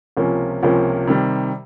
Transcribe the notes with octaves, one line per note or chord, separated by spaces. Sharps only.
C#2 C3 F3 A#3 C#4
C#2 C3 F3 A#3 C#4
C3 D#3 G3